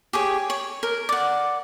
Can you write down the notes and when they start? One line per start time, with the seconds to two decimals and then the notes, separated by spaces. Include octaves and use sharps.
0.13 G4 G#4 C#5
0.50 C#5
0.83 A#4
1.09 D5 F#5